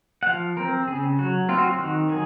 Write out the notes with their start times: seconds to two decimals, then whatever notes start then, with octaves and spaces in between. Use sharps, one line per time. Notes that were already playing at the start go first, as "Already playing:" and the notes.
0.23 F#5
0.27 F3 F5
0.57 C4 A#4
0.88 C#3 G#4
1.19 F#3 F#4
1.49 C4 F4
1.58 F#4
1.67 F4
1.79 D#3 F#4
2.09 F#3 G#4